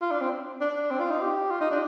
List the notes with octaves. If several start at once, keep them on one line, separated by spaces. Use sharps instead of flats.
F4
D4
C4
D4
C4
F4
D#4
G4
F4
D#4
D4